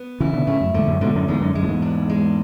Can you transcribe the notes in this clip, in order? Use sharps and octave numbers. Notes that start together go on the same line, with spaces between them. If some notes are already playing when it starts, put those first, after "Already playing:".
Already playing: B3
C#3 E3 E4
B2 D3
A2 C#3 A3
F#2
E2 G#2 D3
F#2 A2
G#2 B2 D3
F#2 A2
E2 G#2 G#3
F#2
F#2 G#3
A2
E2 G#2
D4
G#3